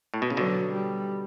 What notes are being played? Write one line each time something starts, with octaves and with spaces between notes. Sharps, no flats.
A2
B2
C#3
B2 D3 F#3
G3